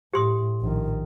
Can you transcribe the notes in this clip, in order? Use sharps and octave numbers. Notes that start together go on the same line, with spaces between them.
A2 G4 C6 D#6
A#1 D#3